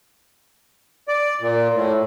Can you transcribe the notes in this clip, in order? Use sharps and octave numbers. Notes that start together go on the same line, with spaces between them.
D5
A#2
A2